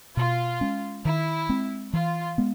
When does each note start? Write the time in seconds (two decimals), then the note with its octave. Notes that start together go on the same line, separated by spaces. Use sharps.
0.17 B2 F4
0.61 G#3 C#4
1.05 D#3 E4
1.49 G#3 C4
1.93 E3 F4
2.38 G#3 B3